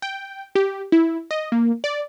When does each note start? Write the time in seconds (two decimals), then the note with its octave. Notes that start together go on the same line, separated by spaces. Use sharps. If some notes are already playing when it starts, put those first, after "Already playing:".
0.02 G5
0.55 G4
0.92 E4
1.31 D#5
1.52 A#3
1.84 D5